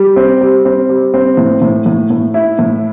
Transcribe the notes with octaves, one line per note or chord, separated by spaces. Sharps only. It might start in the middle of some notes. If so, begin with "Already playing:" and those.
Already playing: G3
C4
G3
C4
G3
C4
A2
A2
A2
A2
E4
A2